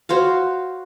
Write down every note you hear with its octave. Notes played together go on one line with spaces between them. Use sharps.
F#4 C5 C#5 F5